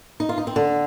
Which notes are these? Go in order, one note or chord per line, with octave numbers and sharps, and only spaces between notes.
D#4
F4
D#4
C4
D3